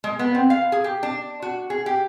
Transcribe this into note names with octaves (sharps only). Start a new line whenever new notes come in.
G#3
B3
C4
F5
G#4
G4
D4
F#4
G#4
G4